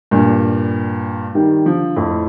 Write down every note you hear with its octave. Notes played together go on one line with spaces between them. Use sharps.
G2 A#2
D#3 G3
D3 F3
F2 A2